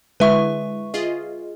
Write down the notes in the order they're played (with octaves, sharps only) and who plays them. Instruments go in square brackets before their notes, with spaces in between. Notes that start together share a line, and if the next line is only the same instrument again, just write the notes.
[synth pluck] D3 G#3 E4 [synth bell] B4 E5 C#6
[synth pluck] F4 G#4 D#5